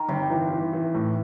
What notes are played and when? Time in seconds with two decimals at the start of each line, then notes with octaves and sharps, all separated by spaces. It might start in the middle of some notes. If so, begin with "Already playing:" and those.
Already playing: D#3
0.08 G1 C3
0.30 E3
0.51 E3
0.73 E3
0.94 A2